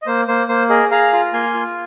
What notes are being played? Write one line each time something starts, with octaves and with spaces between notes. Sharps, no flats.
D#5
A#3 C5
A#3 C5
A#3 C5
G#4 A#4 D#5
G#4 F5 A#5
F4
A#3 G#5 C6
F4